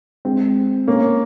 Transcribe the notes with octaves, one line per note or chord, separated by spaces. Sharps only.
G#3 C4
A#3 C#4